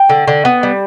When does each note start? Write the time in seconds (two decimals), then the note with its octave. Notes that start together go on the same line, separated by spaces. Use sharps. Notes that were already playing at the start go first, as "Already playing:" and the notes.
Already playing: G5
0.09 D3
0.28 D3
0.45 B3
0.63 G3